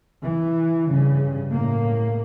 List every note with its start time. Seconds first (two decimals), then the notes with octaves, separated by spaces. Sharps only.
0.22 E3
0.89 G2 C#3
1.51 A2 A#3